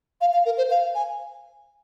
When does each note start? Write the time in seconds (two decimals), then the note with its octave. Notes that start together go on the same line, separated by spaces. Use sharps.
0.21 F5
0.33 F5
0.46 A#4
0.58 C5
0.70 F5
0.95 G#5